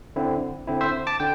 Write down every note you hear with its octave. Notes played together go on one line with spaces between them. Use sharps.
D3 C4 E4
D3 C4 E4
C5 E5
A5 D6
D3 G5